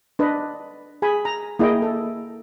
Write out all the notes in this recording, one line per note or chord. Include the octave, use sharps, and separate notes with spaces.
D4 B4 D#5
G#4 G#5 B5
A#5
A#3 E4 G#4 D#5 G5
A4